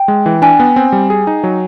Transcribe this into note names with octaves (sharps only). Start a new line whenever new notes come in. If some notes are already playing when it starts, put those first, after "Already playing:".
Already playing: G5
G#3
E3
D4 G#5
B3
C4
G3
G#4
D#4
F#3